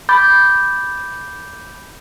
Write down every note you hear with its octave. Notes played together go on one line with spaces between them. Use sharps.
B5 D6 G6 A6